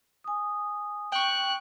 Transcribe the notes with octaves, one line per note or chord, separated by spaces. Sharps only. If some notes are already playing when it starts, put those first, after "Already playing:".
G#5 D#6
G5 C#6 F#6